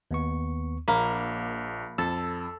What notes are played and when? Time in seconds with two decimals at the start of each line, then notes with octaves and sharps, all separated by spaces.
0.11 D#2 B3 C#6
0.88 A#1 A#3 B5
1.98 F2 A4 E6